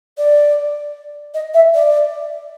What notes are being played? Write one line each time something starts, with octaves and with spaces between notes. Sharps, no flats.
D5
D#5
E5
D5